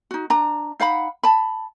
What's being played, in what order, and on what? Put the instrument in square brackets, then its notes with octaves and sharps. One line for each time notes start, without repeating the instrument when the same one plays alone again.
[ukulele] D#4 F#4
D4 A#5
D#4 F5 F#5 B5
A5 B5